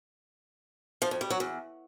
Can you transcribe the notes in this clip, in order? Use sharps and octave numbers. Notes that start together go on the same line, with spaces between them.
F3
F2
G3
F#3
E2